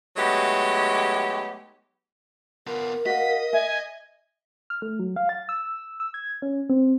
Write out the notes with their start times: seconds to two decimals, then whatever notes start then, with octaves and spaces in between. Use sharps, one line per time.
0.16 F#3 G#3 A3 B3 D#4 G4
2.67 B3 F4 A#4
3.06 F#4 D#5 F5 B6
3.53 E5 G#5
4.70 F6
4.82 A3
4.99 F#3
5.16 F5
5.29 A6
5.49 E6
6.00 E6
6.14 G#6
6.42 C#4
6.70 C4